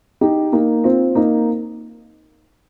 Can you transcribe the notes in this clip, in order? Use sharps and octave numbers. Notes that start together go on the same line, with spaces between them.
D#4 G4
A#3 D#4
C4 F4
A#3 D#4